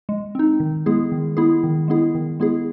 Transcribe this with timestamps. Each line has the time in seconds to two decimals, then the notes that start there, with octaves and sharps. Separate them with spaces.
0.09 G#3
0.35 C4 D#4
0.60 D#3
0.86 G#3 B3 E4 G#4
1.12 D#3
1.37 G#3 B3 E4 G#4
1.63 D#3
1.88 G#3 B3 E4 G#4
2.15 D#3
2.40 G#3 B3 E4 G#4